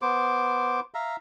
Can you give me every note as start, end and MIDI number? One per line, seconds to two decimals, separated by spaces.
0.02 0.80 59
0.02 0.80 72
0.02 0.80 86
0.94 1.16 76
0.94 1.16 77
0.94 1.16 82